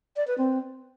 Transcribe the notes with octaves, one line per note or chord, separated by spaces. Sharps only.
D5
B4
C4